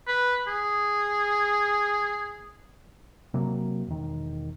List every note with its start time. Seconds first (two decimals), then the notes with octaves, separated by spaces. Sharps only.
0.07 B4
0.47 G#4
3.34 C3 F#3 A#3
3.87 E1 D#3